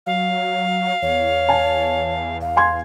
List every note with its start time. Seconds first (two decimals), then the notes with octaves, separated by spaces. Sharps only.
0.07 F#3 F5
1.02 E2 C#5
1.49 G#5 A5
2.41 F5
2.57 G#5 C6 G#6